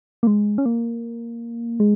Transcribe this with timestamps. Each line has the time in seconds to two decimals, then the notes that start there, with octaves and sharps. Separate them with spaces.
0.23 A#3
0.27 G#3
0.58 C#4
0.66 A#3
1.80 G#3